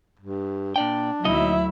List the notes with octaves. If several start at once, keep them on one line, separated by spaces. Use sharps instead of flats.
G2
A#2 D4 D5 G5
D2 A#2 F#3 D#4 E4 D#5 E5